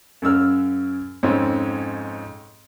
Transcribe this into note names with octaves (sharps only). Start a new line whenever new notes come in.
F#2 C#3 E6 F6
F2 G#2 C4 C#4